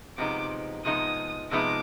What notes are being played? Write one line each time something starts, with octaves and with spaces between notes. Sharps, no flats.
C3 F3 G#3 B3 D#4 D6
C3 F3 G#3 B3 D#4 D#6
C3 F3 G#3 B3 D#4 D6